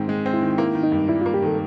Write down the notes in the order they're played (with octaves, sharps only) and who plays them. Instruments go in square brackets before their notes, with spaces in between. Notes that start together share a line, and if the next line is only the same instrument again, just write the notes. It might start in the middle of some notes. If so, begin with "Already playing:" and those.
Already playing: [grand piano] G#2 D#3 C4
[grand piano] G#3 [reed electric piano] D#4
[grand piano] C4
[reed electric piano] E4
[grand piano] D#3
[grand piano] A#3 [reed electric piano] E4
[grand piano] D#3
[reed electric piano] D#4
[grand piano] G2
[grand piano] G3 [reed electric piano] E4
[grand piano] A#3 [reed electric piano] F4
[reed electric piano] G4
[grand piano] D#3 [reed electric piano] A4